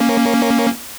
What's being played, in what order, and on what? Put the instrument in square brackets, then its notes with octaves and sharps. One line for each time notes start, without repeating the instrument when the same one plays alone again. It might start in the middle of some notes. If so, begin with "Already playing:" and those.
Already playing: [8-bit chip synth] A#3 C#4